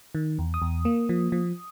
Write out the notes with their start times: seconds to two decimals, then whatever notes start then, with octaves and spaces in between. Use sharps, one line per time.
0.15 D#3
0.39 E2
0.54 D#6
0.62 E2
0.85 A#3
1.09 F3
1.32 F3